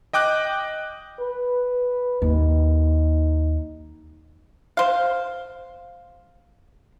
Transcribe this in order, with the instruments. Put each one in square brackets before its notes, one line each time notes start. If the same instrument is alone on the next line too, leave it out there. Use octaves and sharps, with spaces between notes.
[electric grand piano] D#5 G5 D6 F#6 G6
[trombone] B4
[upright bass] D#2 [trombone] D#4
[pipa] C5 F5